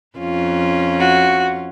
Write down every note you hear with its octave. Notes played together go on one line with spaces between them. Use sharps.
F2 C#4 F4
F#4